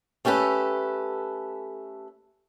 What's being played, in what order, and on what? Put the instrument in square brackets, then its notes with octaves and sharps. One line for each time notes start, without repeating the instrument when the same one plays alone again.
[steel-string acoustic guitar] A3 C#4 G4 A4 B4